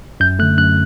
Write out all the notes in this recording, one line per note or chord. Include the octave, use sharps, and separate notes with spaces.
F#2 G6
D3 A3 F#6
F#2 F#6